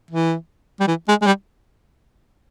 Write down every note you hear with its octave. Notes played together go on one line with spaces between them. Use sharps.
E3
G3
E3
G#3
G#3
G3